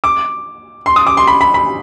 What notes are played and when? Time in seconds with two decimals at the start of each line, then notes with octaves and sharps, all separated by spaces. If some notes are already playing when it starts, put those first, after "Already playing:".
0.04 D6
0.86 C6
0.96 D#6
1.07 D6
1.17 C6
1.27 B5
1.41 B5
1.54 B5